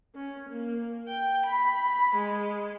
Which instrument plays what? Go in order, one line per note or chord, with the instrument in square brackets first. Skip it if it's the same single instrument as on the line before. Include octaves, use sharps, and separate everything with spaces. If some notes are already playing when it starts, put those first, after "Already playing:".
[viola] C#4
A#3
G5
B5
G#3